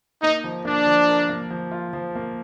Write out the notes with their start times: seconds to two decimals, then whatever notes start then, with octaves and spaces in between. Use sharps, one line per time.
0.23 A#3 D#4
0.44 F3
0.65 A#3 D4
0.86 F3
1.09 A#4
1.29 A#3
1.50 F3
1.71 F4
1.93 F3
2.15 A#3